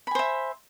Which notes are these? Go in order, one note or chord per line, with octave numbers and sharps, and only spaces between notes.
C5 E5 G#5 B5